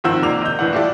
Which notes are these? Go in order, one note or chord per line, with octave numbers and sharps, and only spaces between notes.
G#1 D#3 F3 C4 F#5 E6
C#2 C3 A#3 D5 D6 F7
D#5 G6
D#1 A2 E3 D4 F#5
E4 F4 G4 A4 D5